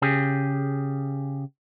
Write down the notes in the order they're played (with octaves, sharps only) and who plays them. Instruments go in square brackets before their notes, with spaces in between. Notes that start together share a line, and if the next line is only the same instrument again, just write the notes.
[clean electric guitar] C#3 G4 G#4